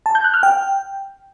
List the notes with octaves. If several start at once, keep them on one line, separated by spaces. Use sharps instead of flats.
A5
G6
F#6
F6
G5